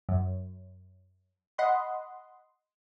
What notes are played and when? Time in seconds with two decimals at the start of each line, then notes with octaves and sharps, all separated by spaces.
0.09 F#2
1.58 D#5 F#5 B5 C6